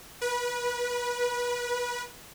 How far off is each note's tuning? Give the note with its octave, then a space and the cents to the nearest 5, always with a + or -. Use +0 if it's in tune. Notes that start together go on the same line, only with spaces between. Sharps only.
B4 -25